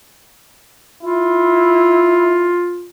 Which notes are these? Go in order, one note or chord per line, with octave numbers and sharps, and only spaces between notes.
E4 F4